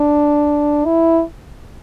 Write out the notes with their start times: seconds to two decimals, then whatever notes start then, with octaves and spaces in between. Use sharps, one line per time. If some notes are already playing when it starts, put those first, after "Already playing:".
Already playing: D4
0.85 E4